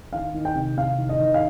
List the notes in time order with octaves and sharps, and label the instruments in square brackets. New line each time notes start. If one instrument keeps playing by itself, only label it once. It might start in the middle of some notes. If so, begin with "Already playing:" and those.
[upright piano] D#3 F5
D#3
G5
C3
C3 F5
D#3
D#5
D#3
F5